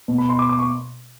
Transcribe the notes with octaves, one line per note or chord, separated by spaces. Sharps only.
B2
B5
C6
D6
D6
C#6